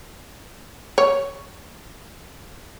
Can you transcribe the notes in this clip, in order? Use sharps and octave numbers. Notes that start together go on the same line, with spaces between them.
C#5